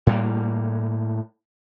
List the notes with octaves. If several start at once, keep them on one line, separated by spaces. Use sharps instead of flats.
A2 G3 A#3